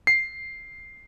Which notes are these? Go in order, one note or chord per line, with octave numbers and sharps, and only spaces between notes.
C7